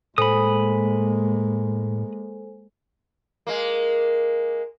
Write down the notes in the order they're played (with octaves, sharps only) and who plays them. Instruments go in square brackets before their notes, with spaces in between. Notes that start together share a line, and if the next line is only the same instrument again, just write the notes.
[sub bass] A2 [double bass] G#3 A#3 [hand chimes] A4 C5 G#5 [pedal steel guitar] B5 D#6
[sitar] G#3 A#3